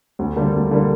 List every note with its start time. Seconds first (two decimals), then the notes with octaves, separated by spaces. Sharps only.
0.19 D2
0.36 D3 G3 A#3
0.54 D2
0.71 D3 G3 A#3